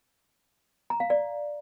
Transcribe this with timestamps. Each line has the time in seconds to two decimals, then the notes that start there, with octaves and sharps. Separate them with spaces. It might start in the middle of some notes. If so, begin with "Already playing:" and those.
0.90 A#5
1.00 F5
1.10 D5